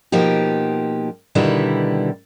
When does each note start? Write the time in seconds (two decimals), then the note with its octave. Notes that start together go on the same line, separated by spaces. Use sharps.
0.12 B2 F3 A#3 D#4 G4
1.35 B2 D3 D#3 G3 E4 B4